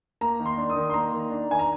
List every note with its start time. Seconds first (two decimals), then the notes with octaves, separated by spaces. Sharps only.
0.21 A#3 A#5
0.40 D#3
0.46 C6
0.57 D4
0.70 D#6
0.76 D#3
0.90 C6
0.94 A#3 A#5
1.12 D#3
1.30 D4
1.49 D#3 G#5
1.59 A#5